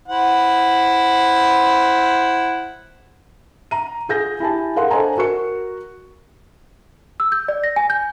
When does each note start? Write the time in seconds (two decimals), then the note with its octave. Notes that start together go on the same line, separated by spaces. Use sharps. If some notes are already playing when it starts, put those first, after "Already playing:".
0.08 E4 C5 F#5
3.71 A#5 D#7
4.09 F4 G#4 G6 A#6
4.40 E4 G4 G#5 A5
4.76 G#4 A#4 F5 F#5 C6
4.91 D4 A4 C5 D#5 G#5 A#5
5.18 F#4 A#4 C#6 C#7
7.20 E6
7.32 G6
7.48 D5
7.64 A#6
7.76 G#5
7.90 G6